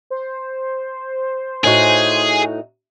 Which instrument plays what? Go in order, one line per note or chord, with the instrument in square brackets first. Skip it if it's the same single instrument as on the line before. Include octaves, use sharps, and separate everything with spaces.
[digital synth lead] C5
[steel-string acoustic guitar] A2 D#4 F#4 [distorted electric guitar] G#4